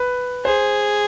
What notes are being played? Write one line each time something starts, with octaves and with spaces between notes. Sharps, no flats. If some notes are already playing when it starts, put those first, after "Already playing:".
Already playing: B4
G#4 C5